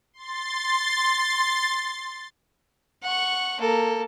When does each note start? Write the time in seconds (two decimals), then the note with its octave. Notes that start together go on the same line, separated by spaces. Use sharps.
0.13 C6 A6
3.03 F#5 C#6
3.60 A#3 A4